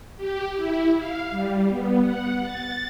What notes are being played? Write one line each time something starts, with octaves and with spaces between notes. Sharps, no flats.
G4
E4
F5
G3
B3
F#5
A6